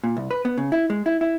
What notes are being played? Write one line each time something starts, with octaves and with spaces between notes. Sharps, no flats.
A#2
C2
B4
B3
C#3
E4
G#3
E4
E4